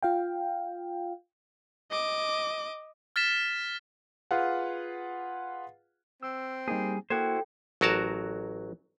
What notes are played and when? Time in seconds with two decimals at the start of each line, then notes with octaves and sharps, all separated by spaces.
0.03 F4 F5 G5
1.91 D#5 D6
3.16 F6 A6 B6 E7
4.31 F4 G#4 B4 F5 F#5
6.23 C4 E6
6.68 G3 A#3 D#4 G#4
7.10 A#3 E4 F#4 A4 C5 G5 G#6
7.81 A1 F#3 F#4 A#4 A5